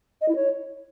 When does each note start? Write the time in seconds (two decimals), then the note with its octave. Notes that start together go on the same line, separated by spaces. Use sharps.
0.21 D#5
0.28 E4
0.36 C#5